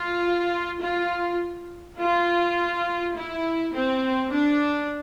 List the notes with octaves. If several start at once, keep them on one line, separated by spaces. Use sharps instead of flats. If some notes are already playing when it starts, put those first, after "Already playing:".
Already playing: F4
F4
F4
E4
C4
D4